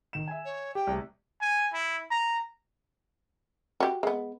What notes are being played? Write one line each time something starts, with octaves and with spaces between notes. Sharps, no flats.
D#3 E7
E5 G#5
C#5
G4 G5
C2 A2
G#5
E4
A#5
F#4 G4
G#3 B3